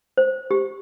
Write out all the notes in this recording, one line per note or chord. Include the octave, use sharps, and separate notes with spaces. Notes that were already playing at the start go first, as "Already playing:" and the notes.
C5
G4